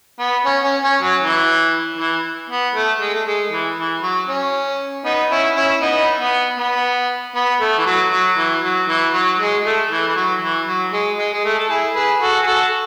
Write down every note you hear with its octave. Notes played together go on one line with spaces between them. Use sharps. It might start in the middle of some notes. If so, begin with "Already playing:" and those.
B3
C#4
C#4
C#4
F#3
E3
E3
B3
A3
G#3
A3
G#3
E3
E3
F#3
C#4
B3 D#4
C#4 E4
C#4 E4
B3 D#4
B3
B3
B3
A3
E3
F#3
F#3
E3
F#3
E3
F#3
G#3
A3
E3
E3
F#3
E3
F#3
G#3
G#3
G#3
A3
A4
E4 G#4
G#4 B4
F#4 A4
G#4
F#4 A4